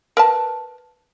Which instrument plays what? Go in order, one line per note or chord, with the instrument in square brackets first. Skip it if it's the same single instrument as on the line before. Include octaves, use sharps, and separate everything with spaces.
[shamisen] A#4 B4 A5